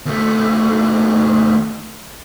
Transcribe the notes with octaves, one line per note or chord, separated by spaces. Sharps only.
D#2 A3